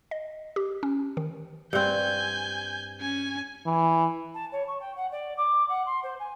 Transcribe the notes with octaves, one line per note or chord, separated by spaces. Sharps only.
D#5
G4
C#4
D#3
G2 C4 G#5 G6
C#4 G#5
E3
A5
C#5
C#6
G5
F#5
D5
D6
F#5
C6
C5
G#5